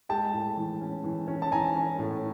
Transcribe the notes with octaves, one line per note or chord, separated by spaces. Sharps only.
G#3 G5 A5
A2
E3
C#4
E3
C#4
A5
E3 G#5 A#5
C#4
A2